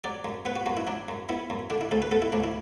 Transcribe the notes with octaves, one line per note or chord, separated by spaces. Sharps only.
F#3 D5
F#2
B3 B4
F#4
F#2 F#4
E4
F#3 D4
F#2
B3 E4
F#2
D3 D4
E4
D2 A4
B4
B3 A4
E4
D2 D4
E4